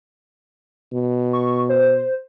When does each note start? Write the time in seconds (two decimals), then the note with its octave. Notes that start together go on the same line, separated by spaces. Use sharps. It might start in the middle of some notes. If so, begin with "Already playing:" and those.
0.92 B2
1.33 C#6
1.69 C5